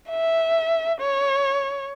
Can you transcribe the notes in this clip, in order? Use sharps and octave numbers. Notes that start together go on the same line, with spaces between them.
E5
C#5